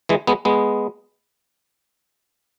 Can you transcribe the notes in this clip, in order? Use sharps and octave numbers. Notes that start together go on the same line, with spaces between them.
E3 G#3
G#3 B3
G#3 B3